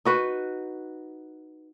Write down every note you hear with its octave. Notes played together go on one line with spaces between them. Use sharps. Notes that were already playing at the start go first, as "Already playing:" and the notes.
D#4 F#4 B4